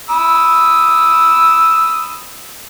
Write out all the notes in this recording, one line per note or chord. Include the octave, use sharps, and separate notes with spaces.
B5 D#6 E6